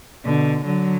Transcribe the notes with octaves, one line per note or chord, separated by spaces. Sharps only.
B2 D3
D3 F#3